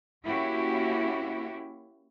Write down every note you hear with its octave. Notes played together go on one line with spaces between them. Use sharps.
A#3 C#4 E4 F#4 G4